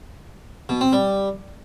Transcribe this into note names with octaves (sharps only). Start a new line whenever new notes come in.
B2
C4
G3